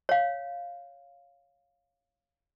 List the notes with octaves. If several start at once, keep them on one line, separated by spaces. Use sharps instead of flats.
C#5 F5